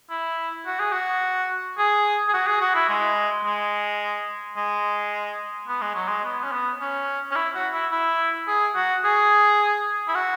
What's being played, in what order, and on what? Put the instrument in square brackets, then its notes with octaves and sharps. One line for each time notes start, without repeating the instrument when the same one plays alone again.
[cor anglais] E4
F#4
G#4
F#4
G#4
G#4
F#4
G#4
F#4
E4
G#3
G#3
G#3
B3
G#3
F#3
G#3
B3
C#4
B3
C#4
C#4
E4
F#4
E4
E4
G#4
F#4
G#4
E4
F#4